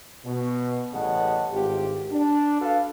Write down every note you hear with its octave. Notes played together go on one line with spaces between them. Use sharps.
B2
A1 C#3 G3 D#5 F#5 A5
G#1 A2 F4 G4
D4
F#4 A4 B4 F5